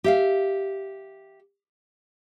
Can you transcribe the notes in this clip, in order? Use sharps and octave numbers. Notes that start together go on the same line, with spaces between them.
G4 E5 F5